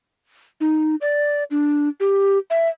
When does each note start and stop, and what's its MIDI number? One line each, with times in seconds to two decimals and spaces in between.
0.61 0.95 63
1.01 1.44 74
1.51 1.89 62
2.00 2.38 67
2.50 2.69 76